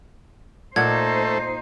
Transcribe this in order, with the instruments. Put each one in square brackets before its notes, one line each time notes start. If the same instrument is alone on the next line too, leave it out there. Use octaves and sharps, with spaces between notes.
[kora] A#2 F#5 [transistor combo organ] A3 [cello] D#4 C5 [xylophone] G#6